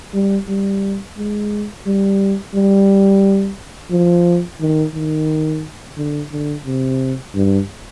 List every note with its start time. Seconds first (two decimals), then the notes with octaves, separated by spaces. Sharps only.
0.14 G3
0.49 G3
1.18 G#3
1.86 G3
2.55 G3
3.91 F3
4.61 D#3
4.95 D#3
5.97 D3
6.32 D3
6.65 C3
7.35 G2